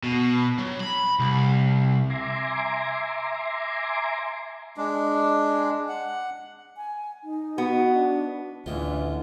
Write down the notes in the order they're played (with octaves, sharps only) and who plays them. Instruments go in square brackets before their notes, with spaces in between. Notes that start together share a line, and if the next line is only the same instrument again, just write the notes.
[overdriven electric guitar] B2
F#3
B5
C2
[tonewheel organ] E5 G#5 A#5 C6 D6
[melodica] G#3 D4
F#5
[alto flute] G#5
D#4
[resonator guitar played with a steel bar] B3 [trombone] F#4
[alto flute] D4
[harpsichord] A1 G#3 F4 [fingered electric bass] D2 [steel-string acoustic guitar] A2 [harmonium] D3 E3 A3